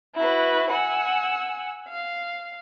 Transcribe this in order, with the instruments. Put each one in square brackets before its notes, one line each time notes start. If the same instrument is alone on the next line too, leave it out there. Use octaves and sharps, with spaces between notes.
[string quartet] E4 F#4 B4
F#5 G#5 E6
F5